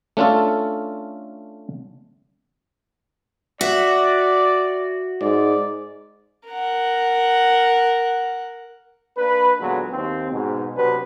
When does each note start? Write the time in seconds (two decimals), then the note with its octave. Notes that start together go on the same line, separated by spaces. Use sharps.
0.17 A3 C#4 D4 F4 A4
3.61 F#4 D5 E5
5.21 G#2 D5
6.49 A#4 F#5
9.17 A#3 D4 B4
9.60 A#2 D3 F#3 G#3 B3
9.92 D#2 C4
10.31 G#2 B2
10.75 C3 F#3 B3 D4 B4